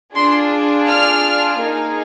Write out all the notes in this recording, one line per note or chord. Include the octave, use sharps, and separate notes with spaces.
D4 F4 G#4 C6
F6
A#3 D#4 G#4